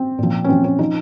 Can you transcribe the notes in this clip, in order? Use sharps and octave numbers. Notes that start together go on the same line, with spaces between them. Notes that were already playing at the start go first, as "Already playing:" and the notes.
Already playing: C4
A#2 F3
C#4
A#2 F3 C4
C#4
F3 D#4